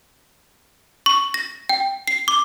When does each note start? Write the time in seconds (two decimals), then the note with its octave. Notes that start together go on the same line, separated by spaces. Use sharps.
1.06 C#6
1.34 A#6
1.69 G5
2.08 C7
2.28 D6